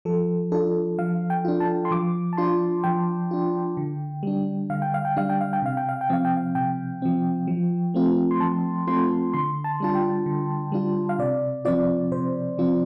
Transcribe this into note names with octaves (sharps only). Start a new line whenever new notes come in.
F3 A4
D4 F4 A4
F3 F5
G5
D4 F4
A5
C6
F3 D6
A5
D4 F4 C6
F3 G5
D4 F4
D3
G3 D4
D3 F5
G5
F5
G5
G3 D4 F5
G5
F5
G5
C3 F5
G5
F5
G5
F3 C4 F5
G5
F5
C3 G5
F3 C4
F3
A3 C4 F4
C6
F3 A5
A3 C4 F4 C6
D3 C6
A5
G3 D4 F4 A5
G5
D3
G3 D4 F4
F5
C3 D5
F3 C4 F4 D5
C3 C5
F3 C4 F4